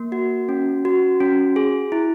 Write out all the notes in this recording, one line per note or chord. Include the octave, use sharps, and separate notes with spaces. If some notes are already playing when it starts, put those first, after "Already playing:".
Already playing: A#3
F#4
C#4
F#4
C#4
G#4
E4